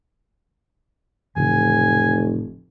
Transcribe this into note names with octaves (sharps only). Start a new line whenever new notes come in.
F1 A2 C#3 E3 G#5